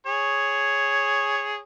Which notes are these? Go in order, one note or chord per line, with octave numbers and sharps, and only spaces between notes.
G#4 C#5